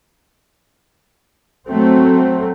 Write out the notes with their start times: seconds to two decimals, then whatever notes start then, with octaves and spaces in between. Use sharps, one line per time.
1.68 F#3 A3 C4